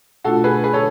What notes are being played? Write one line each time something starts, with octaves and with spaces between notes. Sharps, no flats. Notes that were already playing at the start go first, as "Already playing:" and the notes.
B2 A3 D4 F4 F#4 A4
G#4 B4
G#4 B4
A4 C#5